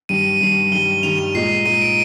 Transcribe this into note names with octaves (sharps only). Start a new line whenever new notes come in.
G2 D#3 G3 D#7
G2 D#3 G3
G2 D#3 G3 G7
G2 D#3 G3 F7
D#7
A#2 G#3 D#4 C7
A#2 G#3 D#4 D#7
D7